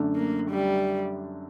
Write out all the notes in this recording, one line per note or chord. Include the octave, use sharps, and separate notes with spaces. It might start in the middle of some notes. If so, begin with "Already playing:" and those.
Already playing: F#2 D3 A3 D4
A#3
G3